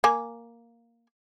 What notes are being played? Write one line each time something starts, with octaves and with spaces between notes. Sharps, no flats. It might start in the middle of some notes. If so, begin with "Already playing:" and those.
A#3 G#5